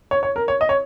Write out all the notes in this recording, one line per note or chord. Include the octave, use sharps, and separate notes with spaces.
C#5
C#5
A#4
C#5
D#5
C#5